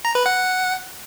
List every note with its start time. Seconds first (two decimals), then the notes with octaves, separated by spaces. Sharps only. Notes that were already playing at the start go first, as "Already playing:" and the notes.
0.05 A#5
0.15 B4
0.26 F#5